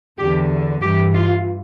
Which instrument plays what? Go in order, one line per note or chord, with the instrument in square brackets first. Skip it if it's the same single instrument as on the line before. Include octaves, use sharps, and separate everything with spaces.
[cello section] E2 D3 G4
G2 E3 G4
F4